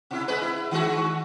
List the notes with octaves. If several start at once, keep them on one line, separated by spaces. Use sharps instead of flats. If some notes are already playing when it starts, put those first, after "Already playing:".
B2 E4
G#3 B4
E4
D#3 G#3 F#4